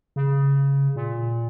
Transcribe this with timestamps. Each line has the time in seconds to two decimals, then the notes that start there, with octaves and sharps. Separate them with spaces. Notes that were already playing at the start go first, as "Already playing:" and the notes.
0.16 C#3
0.96 A#2